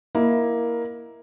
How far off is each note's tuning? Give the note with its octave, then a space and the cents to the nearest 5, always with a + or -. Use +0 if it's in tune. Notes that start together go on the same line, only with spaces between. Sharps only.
A#3 +10 E4 +0 D#5 +0